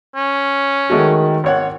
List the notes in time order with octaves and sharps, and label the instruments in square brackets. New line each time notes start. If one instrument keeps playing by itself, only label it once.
[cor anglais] C#4
[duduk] D#3 [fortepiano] G#3 A3 F#4
[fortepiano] G#1 C#5 F#5